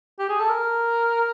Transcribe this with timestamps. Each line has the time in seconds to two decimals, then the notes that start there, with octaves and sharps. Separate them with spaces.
0.19 G4
0.29 G#4
0.40 A4
0.50 A#4